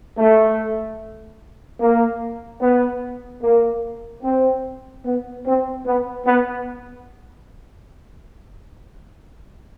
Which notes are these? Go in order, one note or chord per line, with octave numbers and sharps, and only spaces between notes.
A3
A#3
B3
A#3
C4
B3
C4
B3
B3